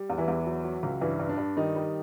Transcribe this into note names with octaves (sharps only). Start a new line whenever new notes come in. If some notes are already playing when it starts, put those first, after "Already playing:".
Already playing: G3
E2
E3 E4
E2
F#3
F#3
C#2
G2 E3 E4
G2
D4
G2
D#3 G3 D#4
G3